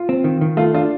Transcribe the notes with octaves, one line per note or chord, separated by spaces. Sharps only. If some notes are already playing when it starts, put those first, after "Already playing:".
Already playing: F4
C4
D#3
D#3
A3 F4
D4 F4